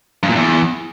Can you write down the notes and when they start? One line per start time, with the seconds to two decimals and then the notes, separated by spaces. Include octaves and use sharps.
0.23 G2
0.29 A#2
0.35 E2